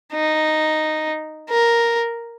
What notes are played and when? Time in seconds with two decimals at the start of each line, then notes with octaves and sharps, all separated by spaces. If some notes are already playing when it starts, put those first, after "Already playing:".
0.13 D#4
1.50 A#4